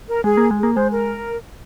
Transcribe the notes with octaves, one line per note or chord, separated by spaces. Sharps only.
A#4
G#3 G#4
A#3
G#3
G#4
A#3
G#3 C5
A#4